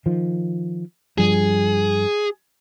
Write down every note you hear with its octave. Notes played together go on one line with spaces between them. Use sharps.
D#3 F3
G2 F3 G3 G#4